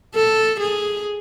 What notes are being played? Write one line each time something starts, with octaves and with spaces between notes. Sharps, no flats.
A4
G#4